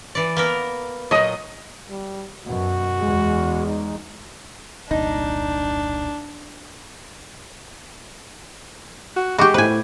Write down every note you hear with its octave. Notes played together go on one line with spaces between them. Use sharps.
E3 D5
A#3 B3 A#4
A#2 F#3 D#5 D#6
G3
F#2 B2 F#4
E2 G#3
D#4
E1 C2 A#2 D4 D#4
F#4
G#3 F#4 G4 C#6 D6
A2 B4 C5 G#5